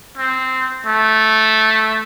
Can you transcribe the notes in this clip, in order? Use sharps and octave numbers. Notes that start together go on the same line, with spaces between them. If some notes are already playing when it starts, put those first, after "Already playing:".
C4
A3